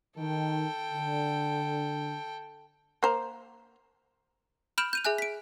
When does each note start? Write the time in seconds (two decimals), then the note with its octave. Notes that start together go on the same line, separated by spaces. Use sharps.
0.18 D#3 A4 G5
0.94 D3
3.03 A#3 C5 A#5
4.78 B5 F6 G6 D7 E7 F#7
4.93 G6 D#7 F7
5.05 G#4 E5 G#5 F#6
5.18 B6 D7